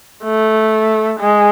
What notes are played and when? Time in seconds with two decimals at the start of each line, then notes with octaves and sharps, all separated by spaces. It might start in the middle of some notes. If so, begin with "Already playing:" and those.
0.24 A3
1.20 G#3